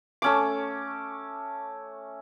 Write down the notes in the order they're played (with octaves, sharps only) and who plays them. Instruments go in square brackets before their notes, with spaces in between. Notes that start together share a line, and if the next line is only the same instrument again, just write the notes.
[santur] A3 C#4 D6